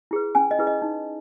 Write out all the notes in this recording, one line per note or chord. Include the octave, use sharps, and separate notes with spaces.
E4 G#4 B4
C#4 G#5
D#5
E4 G#4 B4
D#5
D#4